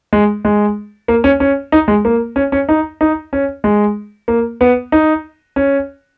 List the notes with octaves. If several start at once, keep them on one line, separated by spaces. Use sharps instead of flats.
G#3
G#3
A#3
C#4
C#4
D#4
G#3
A#3
C#4
C#4
D#4
D#4
C#4
G#3
A#3
B3
D#4
C#4